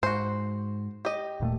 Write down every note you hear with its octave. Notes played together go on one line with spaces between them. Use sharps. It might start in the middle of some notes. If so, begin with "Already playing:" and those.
G#2 F#4 C5
G4 D#5
D#1 A#2 A3